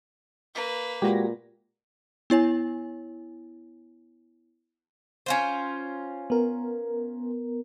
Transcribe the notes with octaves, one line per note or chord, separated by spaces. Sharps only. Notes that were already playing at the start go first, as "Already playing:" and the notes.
A#3 B4
A#2 G#3 F#4 G4 A#6
B3 E4 C#5 G#5
C#4 F4 C5
B3 A#4